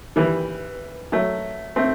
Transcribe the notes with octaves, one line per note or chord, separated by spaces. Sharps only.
E3 G3
F#3 A3
A3 C4